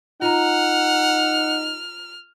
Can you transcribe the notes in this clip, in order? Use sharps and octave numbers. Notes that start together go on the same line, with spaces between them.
D#4 F4 F#5 A#5 F6